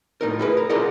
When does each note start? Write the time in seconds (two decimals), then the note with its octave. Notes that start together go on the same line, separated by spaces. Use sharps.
0.21 A2 D#4 A#4
0.39 E4 G#4 B4
0.57 A#4
0.69 F4 G#4 A#4 D5 D#5 F#5